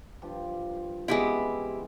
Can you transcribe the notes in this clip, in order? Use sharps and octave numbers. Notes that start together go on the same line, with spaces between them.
G2 F3 G4
C#3 E3 G#3 B3 C4 E4 G4 B5